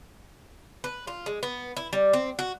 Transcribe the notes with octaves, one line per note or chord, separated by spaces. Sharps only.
B4
F4
G#3
B3
E4
G3
C4
F#4